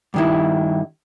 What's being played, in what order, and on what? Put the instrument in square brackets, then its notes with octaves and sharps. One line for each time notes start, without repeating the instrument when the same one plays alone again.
[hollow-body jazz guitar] G2 D#3 E4